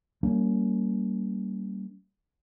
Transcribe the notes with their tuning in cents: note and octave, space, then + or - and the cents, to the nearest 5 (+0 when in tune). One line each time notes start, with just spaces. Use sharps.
G3 -20 A#3 -15 C#4 +25